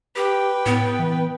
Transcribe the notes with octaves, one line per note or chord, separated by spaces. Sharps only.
G4 B4 G5
A2 B3
E3